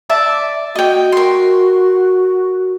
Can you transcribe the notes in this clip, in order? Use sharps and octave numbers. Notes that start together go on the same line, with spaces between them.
D5 E5 A5
F#4 D#5 G5
A#4 C6